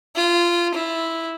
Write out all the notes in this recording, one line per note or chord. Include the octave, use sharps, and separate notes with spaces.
F4
E4